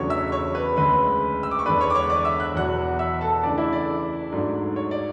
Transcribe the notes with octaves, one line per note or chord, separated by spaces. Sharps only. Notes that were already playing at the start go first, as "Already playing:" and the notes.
Already playing: E2 C#3 F#3 A3 D4 C#5 C#6
E5 E6
C#5 C#6
B4 B5
D2 C#3 G#3 B4 B5
E6
D6
C#6
E2 D3 G#3 B3 D4 B4 B5
C#5 C#6
D6
C#5 C#6
D5 D6
E5 E6
F#6
E2 B2 F#3 F#5 F#6
E5 E6
A4 A5
C#3 E3 A3 D4 D5
E4 E5
D5
G#2 F#3 A3 D4
C#5
D5